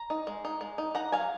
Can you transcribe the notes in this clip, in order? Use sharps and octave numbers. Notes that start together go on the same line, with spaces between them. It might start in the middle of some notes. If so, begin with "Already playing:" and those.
Already playing: A#5
D#4
G#3
D#4
G#3
D#4
D#4 F#5 A#5
F#3 F5 G#5